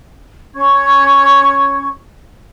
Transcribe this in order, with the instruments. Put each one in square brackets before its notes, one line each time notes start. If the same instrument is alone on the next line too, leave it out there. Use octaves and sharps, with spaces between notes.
[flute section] C#4 C#5 C#6 G#6